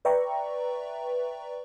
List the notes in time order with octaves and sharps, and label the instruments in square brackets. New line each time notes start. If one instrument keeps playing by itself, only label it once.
[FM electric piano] B4 D5 E5 G5 A#5 C#6